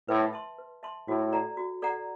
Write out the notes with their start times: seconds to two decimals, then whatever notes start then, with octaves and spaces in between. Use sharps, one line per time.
0.08 A2 B4
0.33 E5 A5 C6
0.58 B4
0.83 E5 A5 C6
1.08 A2 F#4
1.33 A4 D5 F#5 A#5
1.57 F#4
1.82 A4 D5 F#5 A#5